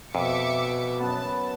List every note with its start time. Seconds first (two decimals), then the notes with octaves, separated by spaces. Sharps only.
0.15 F2 B2 E5 D6 C#7
0.99 F#2 B3 B4 A5